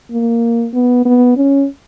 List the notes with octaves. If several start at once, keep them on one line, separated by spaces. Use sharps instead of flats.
A#3
B3
B3
C#4